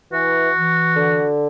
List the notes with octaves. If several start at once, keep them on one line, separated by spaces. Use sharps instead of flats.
E3 F#4
E3
D3